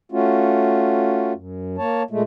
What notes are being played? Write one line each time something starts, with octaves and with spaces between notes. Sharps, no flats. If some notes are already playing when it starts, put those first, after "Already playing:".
A3 C#4 F4 F#4
F#2
A#3 C#5 A5
A#2 G#3 A3